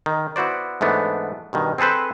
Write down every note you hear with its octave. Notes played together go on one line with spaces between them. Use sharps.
D#3
B3 E4 F#4 C5 D5
G#2 E3 A3 B3 D4
G2 B2 D#3
C4 G#4 A4 B4 C5